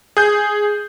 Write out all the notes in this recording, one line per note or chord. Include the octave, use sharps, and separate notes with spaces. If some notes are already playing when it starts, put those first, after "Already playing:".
G#4 G6